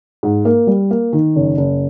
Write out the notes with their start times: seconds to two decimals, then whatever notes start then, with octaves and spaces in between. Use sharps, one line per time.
0.23 G#2
0.45 A#3
0.67 G3
0.91 A#3
1.13 D#3
1.36 F#1
1.57 F#1